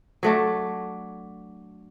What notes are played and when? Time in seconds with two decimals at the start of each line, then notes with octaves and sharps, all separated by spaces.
0.23 F#3 A3 D4